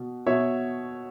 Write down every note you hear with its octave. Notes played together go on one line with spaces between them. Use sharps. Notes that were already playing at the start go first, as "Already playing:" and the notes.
Already playing: B2
B2 C#5 E5